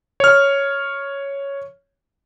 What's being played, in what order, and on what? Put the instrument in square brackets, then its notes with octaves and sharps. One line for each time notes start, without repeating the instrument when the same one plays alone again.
[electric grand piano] C#5 F6